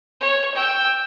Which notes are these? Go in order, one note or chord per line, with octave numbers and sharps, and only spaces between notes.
C#5
G5 E6